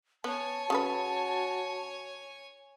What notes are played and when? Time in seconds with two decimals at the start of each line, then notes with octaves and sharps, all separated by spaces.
0.24 B3 C#5 G#5 A5
0.70 C#3 F#4 A4 B4